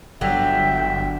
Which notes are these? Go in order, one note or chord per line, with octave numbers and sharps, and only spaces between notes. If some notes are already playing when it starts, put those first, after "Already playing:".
G1 D3 F#3 E5 G5